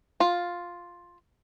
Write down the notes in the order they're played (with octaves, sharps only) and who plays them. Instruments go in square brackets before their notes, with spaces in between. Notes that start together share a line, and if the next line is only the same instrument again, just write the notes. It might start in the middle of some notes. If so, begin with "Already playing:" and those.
[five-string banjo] F4